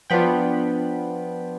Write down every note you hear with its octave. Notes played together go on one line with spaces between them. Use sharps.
F3 B3 D4 F4 G5 B5